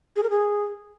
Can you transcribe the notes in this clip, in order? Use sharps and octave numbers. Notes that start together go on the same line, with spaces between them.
G#4
A#4
G#4